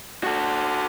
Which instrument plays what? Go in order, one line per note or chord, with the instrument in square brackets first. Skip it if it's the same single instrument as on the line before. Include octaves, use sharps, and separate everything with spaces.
[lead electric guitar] F#4 A4